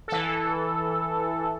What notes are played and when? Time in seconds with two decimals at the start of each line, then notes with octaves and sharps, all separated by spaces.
0.08 E3 A4